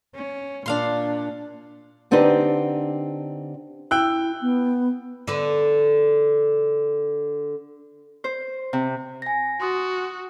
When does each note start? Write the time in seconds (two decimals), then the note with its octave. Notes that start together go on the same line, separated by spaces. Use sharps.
0.15 C#4
0.66 A#2 D4 F5 C6
2.11 D3 C4 D4 D#4 G4 B4
3.91 E4 G5 E6 F#6
4.41 B3
5.28 D3 B4
8.24 C5
8.73 C3
9.22 G#5 A#6
9.61 F#4 C6 D#6 A6